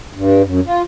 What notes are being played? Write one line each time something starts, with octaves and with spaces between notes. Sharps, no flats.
G2
F#2
F4